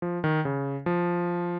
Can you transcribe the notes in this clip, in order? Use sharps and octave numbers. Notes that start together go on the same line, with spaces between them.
F3
D#3
C#3
F3